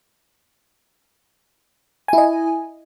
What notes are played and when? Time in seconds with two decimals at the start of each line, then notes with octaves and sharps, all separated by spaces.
2.08 G#5
2.13 E4
2.18 D#5